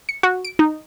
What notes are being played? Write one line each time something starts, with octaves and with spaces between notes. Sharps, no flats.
C#7
F#4
D7
D#4